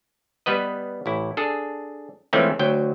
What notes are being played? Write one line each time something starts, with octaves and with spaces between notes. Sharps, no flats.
G3 B3 B4 D#5
A1 E4
D4 G#4 A4
E3 F3 G#3 A3 C4 C#4
D2 F#3 G5